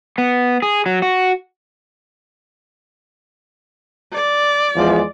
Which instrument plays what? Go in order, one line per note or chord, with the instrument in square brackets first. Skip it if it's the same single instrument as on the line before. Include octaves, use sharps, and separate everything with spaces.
[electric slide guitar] B3
G#4
F#3
F#4
[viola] D5
[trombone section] E2 F3 G#3